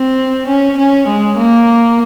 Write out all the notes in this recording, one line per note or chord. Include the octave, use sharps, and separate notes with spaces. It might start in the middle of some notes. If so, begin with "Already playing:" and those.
Already playing: C4
C#4
C#4
G#3
A#3